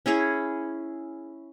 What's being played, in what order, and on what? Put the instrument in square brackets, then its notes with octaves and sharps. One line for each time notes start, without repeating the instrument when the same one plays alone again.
[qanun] C#4 E4 G#4 C#5